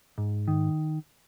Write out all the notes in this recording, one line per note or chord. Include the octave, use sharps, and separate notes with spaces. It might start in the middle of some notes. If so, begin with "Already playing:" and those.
G#2
D#3